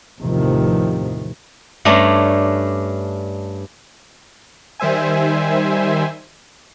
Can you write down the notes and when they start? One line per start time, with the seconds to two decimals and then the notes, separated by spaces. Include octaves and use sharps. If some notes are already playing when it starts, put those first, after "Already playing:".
0.18 A1 E2 C3 D#3 F3
1.85 G2 A3 C#4 D4 A#5
4.80 D#3 G3 C5 E5 G#5